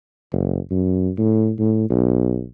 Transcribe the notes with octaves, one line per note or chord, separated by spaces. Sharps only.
F#1
F#2
A2
A2
B1